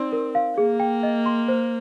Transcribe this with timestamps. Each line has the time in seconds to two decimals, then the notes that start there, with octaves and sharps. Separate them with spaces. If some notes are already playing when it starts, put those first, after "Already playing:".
Already playing: C4 D#4 D5
0.12 A#4
0.35 F5
0.58 A#3 G#4
0.80 G5
1.03 D#5
1.26 C6
1.48 C5